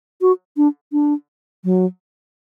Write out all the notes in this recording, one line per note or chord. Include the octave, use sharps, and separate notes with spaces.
F#4
D4
D4
F#3